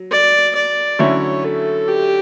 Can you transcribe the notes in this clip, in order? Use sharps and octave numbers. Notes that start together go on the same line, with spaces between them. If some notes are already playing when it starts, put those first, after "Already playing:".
Already playing: F#3
D5
D5
D3 F#3 A3 C#4 E4 C#5
A4
G4